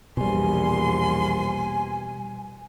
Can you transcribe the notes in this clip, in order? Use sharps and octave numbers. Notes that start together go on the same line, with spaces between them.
A#1 E2 B2 G3 G#5 C6